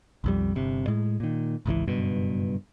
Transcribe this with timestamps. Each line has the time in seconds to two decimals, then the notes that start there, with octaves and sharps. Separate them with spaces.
0.24 B1 F2 G3
0.55 G1 C3
0.87 A2 G#3
1.20 A#2 D#3
1.66 G#1 C#2 C3 E3
1.87 F#1 G2 B2